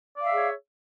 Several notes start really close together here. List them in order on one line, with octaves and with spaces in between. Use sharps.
D5 F5 E5 G#4 C#5